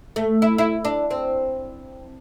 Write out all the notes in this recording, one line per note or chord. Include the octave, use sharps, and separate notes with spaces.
A3
E4
E4
D4
C4